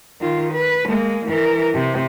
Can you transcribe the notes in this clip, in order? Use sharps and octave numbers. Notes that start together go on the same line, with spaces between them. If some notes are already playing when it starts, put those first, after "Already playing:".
D#3 F4
B4
G#3 A#3
E3 A#4
C3